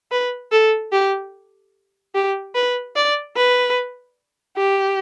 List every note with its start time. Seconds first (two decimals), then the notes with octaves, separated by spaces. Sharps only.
0.12 B4
0.52 A4
0.92 G4
2.15 G4
2.55 B4
2.96 D5
3.37 B4
4.57 G4